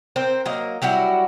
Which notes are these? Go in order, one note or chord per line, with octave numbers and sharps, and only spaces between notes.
C4 A#4 C5
F#3 A#3 A#4 D#5
F#3 G3 E4 F#4